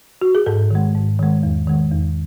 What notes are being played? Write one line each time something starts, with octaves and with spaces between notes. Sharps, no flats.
F#4
G#4
G#2 A4
D#3 G#3
G#2
D#3 G#3
E2
D#3 G#3
E2